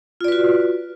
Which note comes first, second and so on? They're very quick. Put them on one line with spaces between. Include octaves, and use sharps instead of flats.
F4 D5 B4 F#4